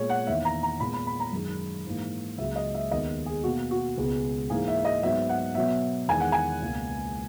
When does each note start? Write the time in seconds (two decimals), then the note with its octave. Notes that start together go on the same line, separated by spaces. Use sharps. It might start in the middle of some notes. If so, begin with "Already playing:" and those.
Already playing: A#2 G#3 B3 C#5
0.10 F#5
0.27 E2 D#3 A#3 E5
0.45 A#5
0.63 A#5
0.80 A#2 G#3 B3 B5
0.93 B5
1.07 B5
1.20 A#5
1.32 F#2 D#3 G#3
1.86 G#2 E3 A#3
2.38 C#2 C#3 F#3 A#3 E5
2.56 D#5
2.74 E5
2.91 D#2 D#3 G#3 B3 D#5
3.26 G#4
3.44 B2 A#3 F#4
3.71 F#4
3.97 C#2 B2 G#3 B3
4.49 G#2 E3 A#3 G#4
4.68 E5
4.85 D#5
5.03 G#2 F#3 B3 E5
5.29 F#5
5.55 B2 F#3 B3 E5
6.08 E2 D#3 G#3 G#5
6.20 F#5
6.32 G#5
6.61 C#2 B2 A#3